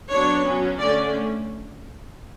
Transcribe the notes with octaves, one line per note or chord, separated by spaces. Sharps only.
F#3 B3 D4 C#5
F#3 C#4
D3 A3 C#4 D5